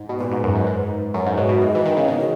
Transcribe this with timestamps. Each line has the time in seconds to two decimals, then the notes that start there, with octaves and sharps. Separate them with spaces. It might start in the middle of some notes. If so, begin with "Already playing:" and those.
Already playing: G#2
0.09 B2
0.19 A#2 B4
0.31 G#2
0.44 F#2
0.55 G#2
0.66 G#2
1.14 F#2 C#5
1.27 G#2
1.38 B2 E5
1.49 B2
1.61 G#2 D#5
1.75 E3
1.86 D#3
1.97 C#3
2.08 B2